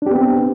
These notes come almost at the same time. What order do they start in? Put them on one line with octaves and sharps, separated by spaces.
D4 G4 B3 C4